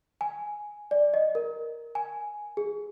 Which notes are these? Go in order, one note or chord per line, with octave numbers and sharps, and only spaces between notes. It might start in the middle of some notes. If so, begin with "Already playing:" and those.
G#5
D5
D#5
A#4
G#5
G#4